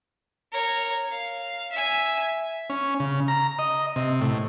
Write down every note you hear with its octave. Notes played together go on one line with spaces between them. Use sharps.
A#4 C#5
F5
E5 G#5
C#4
C#3
A#5
D#5
C3
A2